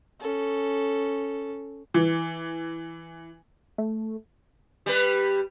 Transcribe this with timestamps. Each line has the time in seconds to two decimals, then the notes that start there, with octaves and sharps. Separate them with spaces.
0.20 C#4 A4
1.94 E3
3.78 A3
4.86 G3 B4